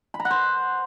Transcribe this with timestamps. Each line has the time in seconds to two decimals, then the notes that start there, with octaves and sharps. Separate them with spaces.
0.14 B5
0.20 A#5
0.25 F#5
0.31 C5